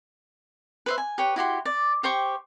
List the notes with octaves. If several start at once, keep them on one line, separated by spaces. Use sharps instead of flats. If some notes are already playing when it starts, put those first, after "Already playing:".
B4 C5 E5
G#5
G4 B4 C#5
E4 F#4 G4 C6
D5
G4 C5 G5 C#6